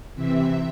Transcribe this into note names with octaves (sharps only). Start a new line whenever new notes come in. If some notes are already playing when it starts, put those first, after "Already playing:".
C3 E3 C4 E5